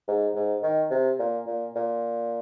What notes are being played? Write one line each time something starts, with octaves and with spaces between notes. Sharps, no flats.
G#2
G#2
D#3
C3
A#2
A#2
A#2